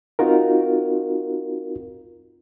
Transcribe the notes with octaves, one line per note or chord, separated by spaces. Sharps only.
C4 D#4 F4 F#4 A#4